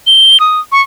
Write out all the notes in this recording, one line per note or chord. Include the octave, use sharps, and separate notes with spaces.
G7
D#6
C#6